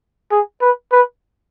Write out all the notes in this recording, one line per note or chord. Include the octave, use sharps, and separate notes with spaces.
G#4
B4
B4